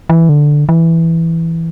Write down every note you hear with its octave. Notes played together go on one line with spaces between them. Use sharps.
E3
D3
E3